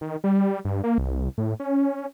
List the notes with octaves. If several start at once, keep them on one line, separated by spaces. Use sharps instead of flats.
D#3
G3
G2
A#3
C2
A2
C#4